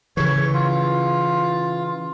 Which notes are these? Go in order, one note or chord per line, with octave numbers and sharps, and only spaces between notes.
C#3 E3 C#5
F4